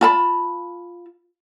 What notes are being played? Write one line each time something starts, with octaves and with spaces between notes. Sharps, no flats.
F4 A5 B5